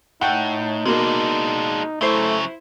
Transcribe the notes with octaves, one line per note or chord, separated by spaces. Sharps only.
A2 D#4 F#5 G5
B2 G#3 A#3 D4
C#3 F#3 A3 E4 C5